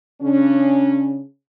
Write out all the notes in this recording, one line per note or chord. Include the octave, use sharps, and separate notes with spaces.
C#3 C#4 D4